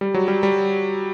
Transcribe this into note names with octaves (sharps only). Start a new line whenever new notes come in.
G3
F#3
G3
G3